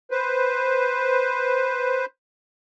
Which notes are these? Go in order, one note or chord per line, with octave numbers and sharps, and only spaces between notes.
B4 C5